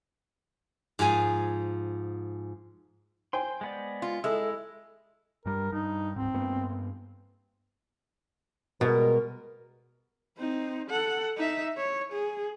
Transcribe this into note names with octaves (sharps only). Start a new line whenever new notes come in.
G#2 F3 G#4 G#5
C5 G5 G#5 C6
G#3 B3 D5
F4
G#3 E4 A4 E5 E6
G2 G3 A#4
G2 D#4
D1 G#2 C4
G2 A#3 B3
B2 G3 G#3 A#4
C4 D#4
A4 F#5
D#4 E5
C#5
G#4